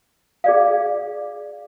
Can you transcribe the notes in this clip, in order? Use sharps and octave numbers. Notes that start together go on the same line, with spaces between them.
G#4 D5 F5